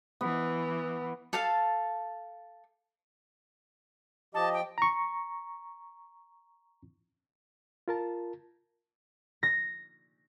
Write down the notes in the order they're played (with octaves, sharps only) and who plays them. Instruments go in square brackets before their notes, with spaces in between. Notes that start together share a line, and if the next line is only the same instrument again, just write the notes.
[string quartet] E3 [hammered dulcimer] B3
[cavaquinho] A4 F5 A5
[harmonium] F3 G4 D#5 [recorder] A5
[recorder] G5
[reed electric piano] A#5 C#6
F4 A#4 A5
[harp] A#6